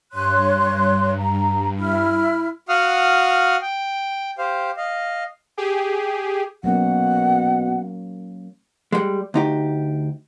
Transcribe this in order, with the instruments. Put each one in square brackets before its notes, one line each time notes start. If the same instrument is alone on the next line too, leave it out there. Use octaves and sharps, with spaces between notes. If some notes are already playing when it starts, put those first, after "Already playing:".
[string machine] G2 [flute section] C#5 C6 F#6
[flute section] A#5
E4 B5 F6
[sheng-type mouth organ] F#4 F5 F#5 D#6 F6
G5
G4 C5 F5
D#5 F5
[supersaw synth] G4 G#4
[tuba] B2 [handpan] F#3 A#3 C#4 [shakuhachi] F#5
[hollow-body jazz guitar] G3 G#3
D2 D#4 G4